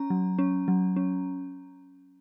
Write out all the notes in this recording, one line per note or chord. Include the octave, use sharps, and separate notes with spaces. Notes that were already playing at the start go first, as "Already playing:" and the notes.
Already playing: C#4 A#5
F#3
C#4
F#3
C#4